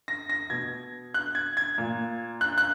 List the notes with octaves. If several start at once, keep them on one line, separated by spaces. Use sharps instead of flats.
A#6
A#6
B2 G#6
F#6
G#6
G#6
A#2
F#6
F#6